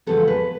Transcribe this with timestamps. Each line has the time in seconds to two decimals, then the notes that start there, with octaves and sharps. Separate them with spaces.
0.07 E2 C#3 F3 G#3 B3 A4
0.28 B4